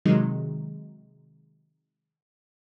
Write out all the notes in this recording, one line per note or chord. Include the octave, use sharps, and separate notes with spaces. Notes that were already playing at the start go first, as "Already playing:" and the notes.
C3 D#3 F#3 G#3 D#4